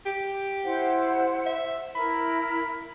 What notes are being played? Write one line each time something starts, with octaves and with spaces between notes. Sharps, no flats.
G4
E4 C5 F#5
E5
E4 A#4 B5